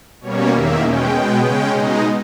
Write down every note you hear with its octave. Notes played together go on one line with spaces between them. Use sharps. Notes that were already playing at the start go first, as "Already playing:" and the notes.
B2 G3 A#3 C#4 C#5
E2 D#3 A#3 E5
B2 G#3 C#4 G5
B2 G#3 B3
C#3 G#3 C#4 G5
B2 G#3 D#4 D#5